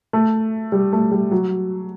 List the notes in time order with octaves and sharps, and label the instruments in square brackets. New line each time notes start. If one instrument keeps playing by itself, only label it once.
[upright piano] A3
G3
A3
G3
F#3